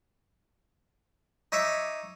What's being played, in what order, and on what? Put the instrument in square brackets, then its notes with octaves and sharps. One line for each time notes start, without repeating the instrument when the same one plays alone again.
[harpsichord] D#4 C#5 E5 D6